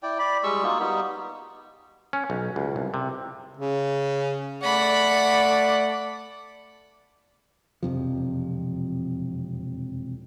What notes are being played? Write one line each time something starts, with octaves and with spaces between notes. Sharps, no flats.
E4 D5 G5
D5 B5
G3 G#3 C#6 E6
A#3 D#4 F4 F#4
G3 B3 D#4
C#4
B1
C#2
C2
C3
C#3
A3 D5 F#5 B5
E1 F2 C3 F3